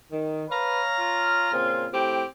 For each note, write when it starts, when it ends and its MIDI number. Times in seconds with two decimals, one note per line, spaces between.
0.11 0.44 51
0.49 0.82 71
0.49 1.49 73
0.49 1.49 77
0.49 1.49 82
1.00 1.93 65
1.51 1.86 46
1.51 1.86 49
1.51 1.86 60
1.91 2.23 45
1.91 2.23 60
1.91 2.23 67